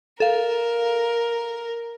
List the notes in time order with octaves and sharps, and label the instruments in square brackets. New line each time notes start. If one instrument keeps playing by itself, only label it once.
[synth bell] A4 F5 [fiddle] A#4